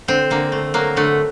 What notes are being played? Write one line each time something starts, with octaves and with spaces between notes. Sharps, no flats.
D3 C4
D3 A#3
A3
F#3 A#3
D3 A3